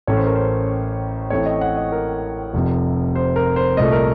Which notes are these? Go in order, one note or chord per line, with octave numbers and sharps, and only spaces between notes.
A1 A2 A3 C#4 C#5
C5
A#4
C5
A1 A2 A3 C4 C#5
D#5
F#5
D#5
A#4
F1 F2 C3
C5
A#4
C5
C2 A#2 A3 D#5
A#4